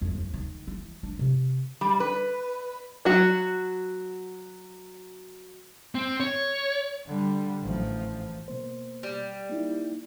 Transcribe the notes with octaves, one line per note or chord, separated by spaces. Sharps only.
F2
D#2
D#3
E3
D4
C3
G3
B4
F#3 F#4
C4
C#5
D3 G3
A1 F3
B2 A#3 C5
G3
A#3 D#4 E4